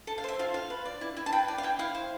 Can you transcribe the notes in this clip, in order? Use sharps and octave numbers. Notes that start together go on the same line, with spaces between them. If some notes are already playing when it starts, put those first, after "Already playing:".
A4 A5
F5
C5 E5
F4 F5
F4 F5
B4
D5
E4
E4
A5
B4 G5
D5
F5
E4 G5
E4 F5
C5